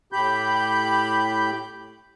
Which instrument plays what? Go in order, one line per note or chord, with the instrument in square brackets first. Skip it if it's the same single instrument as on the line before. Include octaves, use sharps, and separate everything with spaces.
[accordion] A2 G4 B5 G6